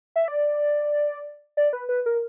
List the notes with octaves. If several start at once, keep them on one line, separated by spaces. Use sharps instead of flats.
E5
D5
D5
B4
B4
A#4